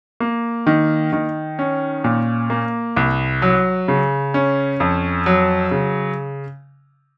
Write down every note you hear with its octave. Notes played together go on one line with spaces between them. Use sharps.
A#3
D#3
D#3
C#4
A#2
A#3
C2
F#3
C#3
C#4
F2
F#3
C#3